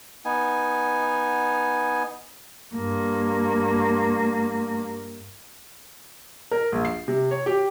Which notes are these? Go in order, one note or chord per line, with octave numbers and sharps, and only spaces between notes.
B3 D#4 G#5
G2 A#3
A#4
A#1
C7
C3
C#5
G4